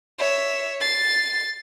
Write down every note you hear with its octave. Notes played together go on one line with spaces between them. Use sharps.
C#5 E5
A6 C7